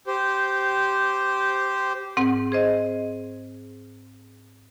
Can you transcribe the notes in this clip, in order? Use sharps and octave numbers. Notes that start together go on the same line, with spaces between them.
G4 C5
G#2 C4 F#5
G#4 C5 D#5